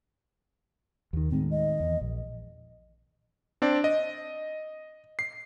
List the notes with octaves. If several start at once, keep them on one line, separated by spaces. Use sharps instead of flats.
D#2 D#3
A2 D#3 G#3 C4
D#5
E2
A#1
C4 D4 D5
D#5
C7